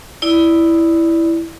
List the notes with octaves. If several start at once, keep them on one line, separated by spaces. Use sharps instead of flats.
E4 D5